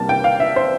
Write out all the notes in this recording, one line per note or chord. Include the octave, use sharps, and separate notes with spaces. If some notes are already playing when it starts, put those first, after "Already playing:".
Already playing: C2 C3 G3 A#3 A5
G5
F5
E5
C5